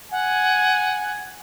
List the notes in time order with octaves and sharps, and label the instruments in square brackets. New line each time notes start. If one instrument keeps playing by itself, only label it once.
[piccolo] F#5 [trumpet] G#5